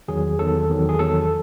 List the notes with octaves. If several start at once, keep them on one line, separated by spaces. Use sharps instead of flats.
E2 D#3 F#3 G#4
E2 D#3 F#3 A4
E2 D#3 F#3
G#4
E2 D#3 F#3 A4